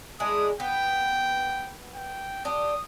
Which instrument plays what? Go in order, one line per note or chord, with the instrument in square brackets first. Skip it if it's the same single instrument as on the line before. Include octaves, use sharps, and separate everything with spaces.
[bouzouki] G#3 D4 E4 [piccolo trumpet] D#6
[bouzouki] B3 [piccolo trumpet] G5
[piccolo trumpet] G5
[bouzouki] D4 G4 [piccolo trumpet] D#6